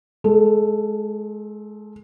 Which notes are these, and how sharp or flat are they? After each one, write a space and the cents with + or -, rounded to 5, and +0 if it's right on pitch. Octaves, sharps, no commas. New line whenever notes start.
G#3 +25 A4 +0